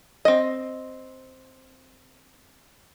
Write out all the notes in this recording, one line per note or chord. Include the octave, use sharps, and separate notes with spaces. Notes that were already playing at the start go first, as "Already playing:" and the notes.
C4 D#5